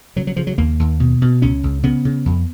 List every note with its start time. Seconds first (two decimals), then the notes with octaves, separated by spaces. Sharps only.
0.16 C#3 F#3
0.27 F#3
0.36 C#3 F3
0.47 F#3
0.58 D#2 A#3
0.80 D#2
1.00 B2
1.22 B2
1.42 C#2 C#4
1.63 C#2
1.83 C#3 B3
2.05 C#3
2.26 F2